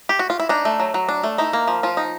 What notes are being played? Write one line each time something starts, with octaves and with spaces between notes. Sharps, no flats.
G4
F#4
F4
E4
D4 D#4
A3
F#3
F#3
D4
A3
D#4 E4
A#3
F3
F3 F4
D#4